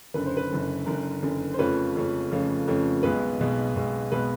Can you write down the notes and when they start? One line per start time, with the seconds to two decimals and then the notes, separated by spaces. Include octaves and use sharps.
0.14 F#1 F#2 D3 B4
0.26 C5
0.37 B4
0.50 F#1 F#2 D3
0.86 F#1 F#2 D3 A#4
1.23 F#1 F#2 D3
1.54 C5
1.59 F2 C#3 F3 A3 C#4 B4
1.96 F2 C#3 F3 A3 C#4
2.31 F2 C#3 F3 A3 C#4
2.68 F2 C#3 F3 A3 C#4
3.03 B1 B2 G#3 B3 B4
3.39 B1 B2 G#3 B3
3.75 B1 B2 G#3 B3
4.12 B2 G#3 B3 B4